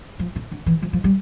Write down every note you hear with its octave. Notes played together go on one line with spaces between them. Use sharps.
F3
D3
D3
E3
F3
F3
G3